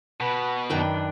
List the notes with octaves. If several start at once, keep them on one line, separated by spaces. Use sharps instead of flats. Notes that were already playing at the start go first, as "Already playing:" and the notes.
B2 B4
F#2 D#3 D4 B4 G5